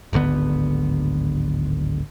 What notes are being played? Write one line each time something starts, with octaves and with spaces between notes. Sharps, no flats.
D1 G#1 D3 B3